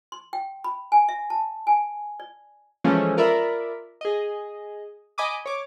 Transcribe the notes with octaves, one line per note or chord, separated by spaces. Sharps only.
C6
G5
B5
G#5
E5
A5
G#5
D5
E3 F3 G#3 A3 C#4
F4 A#4 D5 E5 B5
G#4 D#5
D#5 G#5 B5 D6 D#6
C#5 D6